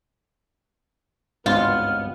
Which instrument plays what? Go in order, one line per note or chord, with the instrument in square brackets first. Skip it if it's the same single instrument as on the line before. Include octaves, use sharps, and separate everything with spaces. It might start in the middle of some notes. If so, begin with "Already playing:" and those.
[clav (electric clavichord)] G#1 C#2 G2 [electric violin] B3 [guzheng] F4 [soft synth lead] F6